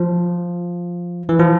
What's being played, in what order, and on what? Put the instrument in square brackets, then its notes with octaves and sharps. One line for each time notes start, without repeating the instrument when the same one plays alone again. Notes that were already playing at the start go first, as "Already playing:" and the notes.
Already playing: [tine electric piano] F3
E3
F3